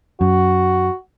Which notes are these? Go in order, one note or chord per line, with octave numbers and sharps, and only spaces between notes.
F#2 F#4